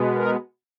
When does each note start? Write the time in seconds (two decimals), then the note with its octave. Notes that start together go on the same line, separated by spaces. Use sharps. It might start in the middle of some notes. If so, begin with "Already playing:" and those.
Already playing: B2 G#3 B3
0.14 A#4